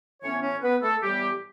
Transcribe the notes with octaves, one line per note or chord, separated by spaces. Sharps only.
A2 E3 B3 C#4 C#5
C#4 C#5
B3 B4
A3 A4
A2 E3 G3 B3 G4